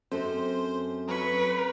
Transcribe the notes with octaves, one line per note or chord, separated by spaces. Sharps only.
F#2 C4 A4 C5
F#3 B4 C#6